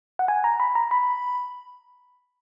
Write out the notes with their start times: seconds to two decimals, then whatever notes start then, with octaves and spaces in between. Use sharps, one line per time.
0.19 F#5
0.28 G#5
0.44 A#5
0.60 B5
0.75 A#5
0.91 B5